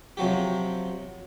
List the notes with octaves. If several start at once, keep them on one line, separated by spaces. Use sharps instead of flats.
C3 F3 F#3 G4